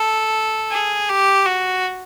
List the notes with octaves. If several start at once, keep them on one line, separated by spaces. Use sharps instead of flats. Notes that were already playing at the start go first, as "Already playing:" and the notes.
Already playing: A4
G#4
G4
F#4